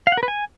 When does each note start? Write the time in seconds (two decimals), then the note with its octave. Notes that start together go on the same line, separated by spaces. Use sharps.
0.07 F5
0.12 F#5
0.17 A#4
0.23 B4
0.28 G#5